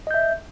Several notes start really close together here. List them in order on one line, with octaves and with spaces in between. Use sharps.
D#5 G6 E5